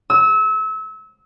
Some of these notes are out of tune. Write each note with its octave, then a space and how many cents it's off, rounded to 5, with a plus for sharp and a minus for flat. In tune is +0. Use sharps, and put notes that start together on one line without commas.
E6 -30